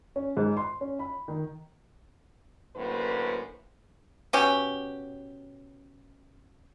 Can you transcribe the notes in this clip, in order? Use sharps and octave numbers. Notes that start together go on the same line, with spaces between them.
C#4
G#2
C6
C#4
B5
D#3
F#2 A2 D3 A#3 B4 C5
B2 C#4 G4